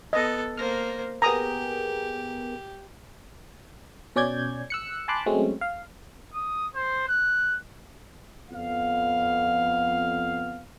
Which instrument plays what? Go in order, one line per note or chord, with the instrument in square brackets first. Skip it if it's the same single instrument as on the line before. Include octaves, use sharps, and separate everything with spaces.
[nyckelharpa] B3 A4 [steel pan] D#5
[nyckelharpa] A#3 C5 [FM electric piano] F6 A#6
[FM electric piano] B3 G#4 A#4 [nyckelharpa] G4 [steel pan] A#5 D#6
[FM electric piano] B2 C#4 D5 G6 G#6
E6 F#6 C#7
G#5 A5 B5 C6 D6 F#6
F#3 G#3 A3 C4 C#4
F5
[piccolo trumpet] D#6
C5
F#6
[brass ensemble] F2 B3 F5